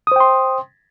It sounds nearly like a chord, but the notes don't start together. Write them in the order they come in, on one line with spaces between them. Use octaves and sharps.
D#6 C5 G5 C6